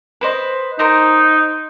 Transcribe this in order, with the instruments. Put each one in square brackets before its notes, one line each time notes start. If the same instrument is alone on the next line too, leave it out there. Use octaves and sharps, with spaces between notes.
[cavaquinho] B4 C5 D#5
[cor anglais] D#4 [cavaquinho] A#4 C5 A#5